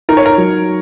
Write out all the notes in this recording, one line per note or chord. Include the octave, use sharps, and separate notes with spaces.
D#4 A#4
C#5
A#4
F#3